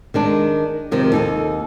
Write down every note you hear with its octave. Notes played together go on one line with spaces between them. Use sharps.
D#3 G#3 D4
C3 D#3 F3 G#3
D#2 D#4 A4